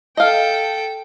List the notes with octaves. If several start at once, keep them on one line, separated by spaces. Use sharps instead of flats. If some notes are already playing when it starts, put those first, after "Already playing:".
A4 D#5 F5 G5